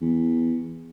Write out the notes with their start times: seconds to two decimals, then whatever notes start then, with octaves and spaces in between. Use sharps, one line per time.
0.01 E2